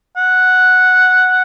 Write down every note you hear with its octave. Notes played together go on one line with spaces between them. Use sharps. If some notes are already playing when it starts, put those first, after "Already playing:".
F#5